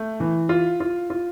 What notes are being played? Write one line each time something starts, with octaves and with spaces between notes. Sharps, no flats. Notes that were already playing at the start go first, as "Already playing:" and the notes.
Already playing: A3
E3
F4
F4
F4